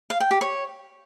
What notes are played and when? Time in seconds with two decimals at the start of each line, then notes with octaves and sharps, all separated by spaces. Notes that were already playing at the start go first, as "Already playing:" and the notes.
0.10 F5
0.20 G5
0.31 G4
0.41 C#5